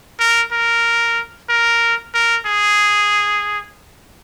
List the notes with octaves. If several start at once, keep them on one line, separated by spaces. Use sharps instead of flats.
A#4
A#4
A#4
A#4
G#4